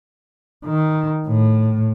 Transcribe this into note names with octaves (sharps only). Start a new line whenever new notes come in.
D#3
A2